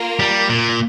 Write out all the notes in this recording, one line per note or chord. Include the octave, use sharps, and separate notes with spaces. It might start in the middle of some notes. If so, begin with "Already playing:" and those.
Already playing: A#3 F4 A#4
G3
A#2